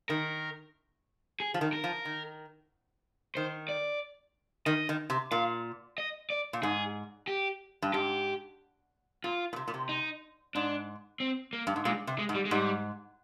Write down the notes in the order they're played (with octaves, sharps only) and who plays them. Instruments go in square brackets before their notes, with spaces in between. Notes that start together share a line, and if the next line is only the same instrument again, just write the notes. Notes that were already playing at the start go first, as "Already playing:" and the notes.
[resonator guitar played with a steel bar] D#3 [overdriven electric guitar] A#4
[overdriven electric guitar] G#4
[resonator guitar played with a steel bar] F3
D#3
[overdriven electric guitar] A#4
[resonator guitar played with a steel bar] F3
D#3
[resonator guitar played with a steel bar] D#3 [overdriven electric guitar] C5
[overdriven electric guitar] D5
[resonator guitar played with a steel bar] D#3 [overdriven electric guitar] D#5
[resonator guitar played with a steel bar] D#3
C3
[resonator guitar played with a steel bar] A#2 [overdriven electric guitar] F5
[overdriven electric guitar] D#5
D5
[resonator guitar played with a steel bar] A#2
[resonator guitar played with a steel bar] G#2 [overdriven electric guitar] G#4
[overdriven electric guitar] G4
[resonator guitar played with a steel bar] G2
[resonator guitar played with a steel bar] G#2 [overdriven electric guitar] G4
[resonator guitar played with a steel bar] A#2 [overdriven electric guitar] F4
[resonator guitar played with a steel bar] A#2
C3
A#2
C3
[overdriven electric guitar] D#4
[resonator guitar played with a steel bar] G#2 [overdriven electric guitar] D4
[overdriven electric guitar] C4
A#3
[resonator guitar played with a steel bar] G2
G#2
[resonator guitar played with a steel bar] A#2 [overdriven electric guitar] G#3
[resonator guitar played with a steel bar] C3
[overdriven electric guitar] G#3
[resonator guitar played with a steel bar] G#2
[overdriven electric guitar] G3
G#3
[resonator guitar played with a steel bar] G#2 [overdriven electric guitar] G3